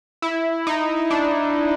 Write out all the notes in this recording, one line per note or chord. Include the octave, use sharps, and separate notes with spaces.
E4
D#4
D4